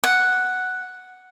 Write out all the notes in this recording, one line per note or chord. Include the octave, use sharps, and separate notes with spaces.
F#5